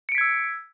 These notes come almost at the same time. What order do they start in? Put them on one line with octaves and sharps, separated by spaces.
C#7 D7 B6 G#6 E6